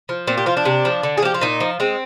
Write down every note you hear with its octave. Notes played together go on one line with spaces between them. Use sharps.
F3
A#2 C4
G4
F3 F4
D4
C3
F3
D3
G#4
F3 G4
F4
A#2 D#4
F3
G#3 C4